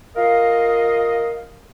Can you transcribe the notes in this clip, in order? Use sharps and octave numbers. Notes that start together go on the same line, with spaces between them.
F4 A#4 D#5 F5